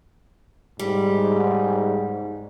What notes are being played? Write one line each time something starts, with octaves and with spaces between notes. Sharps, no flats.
G#2 G3